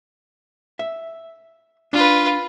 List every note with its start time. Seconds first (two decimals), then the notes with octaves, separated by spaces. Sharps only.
0.79 E5
1.93 D4 F4 B4